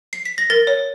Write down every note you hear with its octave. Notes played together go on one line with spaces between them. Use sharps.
C7
B6
A#6
A#4 A6
C#5